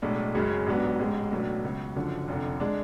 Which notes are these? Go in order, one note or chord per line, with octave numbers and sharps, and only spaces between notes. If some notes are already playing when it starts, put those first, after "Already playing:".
B1 A2 G#3 D4
F#1 F#2 C#3 G#3
A1 G#2 F#3 B3 D4
A1 G#2 G#3
B1 A2 F#3 B3 D4
C#2 B2 F#3
F#1 F#2 D3 F3
F1 F2 D3
G#3 D4